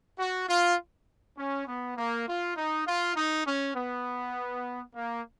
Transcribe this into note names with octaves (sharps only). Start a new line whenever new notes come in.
F#4
F4
C#4
B3
A#3
F4
D#4
F4
D#4
C#4
B3
A#3